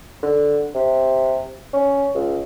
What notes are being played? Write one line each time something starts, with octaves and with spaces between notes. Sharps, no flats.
D3
C3
C#4
C#2